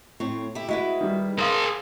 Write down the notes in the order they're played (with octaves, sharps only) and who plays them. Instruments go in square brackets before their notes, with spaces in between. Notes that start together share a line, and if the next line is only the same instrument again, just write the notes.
[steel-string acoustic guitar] A2 C4 C#5
E4 G4
[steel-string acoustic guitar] G#3 E4 B4 [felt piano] F#4
[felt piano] D#3 G3
[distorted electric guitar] G#4 A#4 [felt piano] F5 C6 D#6